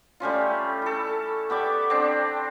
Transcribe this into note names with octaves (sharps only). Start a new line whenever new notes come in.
G3 A3 C#4 F4
E4 A4
B3 G4 D5 E5
C4 D4